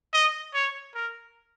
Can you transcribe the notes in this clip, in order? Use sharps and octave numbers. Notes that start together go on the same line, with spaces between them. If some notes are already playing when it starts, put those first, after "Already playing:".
D#5
C#5
A#4